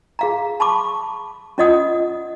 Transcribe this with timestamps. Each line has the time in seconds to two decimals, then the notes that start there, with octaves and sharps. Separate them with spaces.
0.19 G#4 F5 A#5
0.60 A5 B5 C#6 D6
1.58 C#4 F4 D5 D#5 F#5 D#6